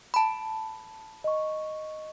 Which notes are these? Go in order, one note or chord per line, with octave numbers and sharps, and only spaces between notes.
A5 B5
D#5 C#6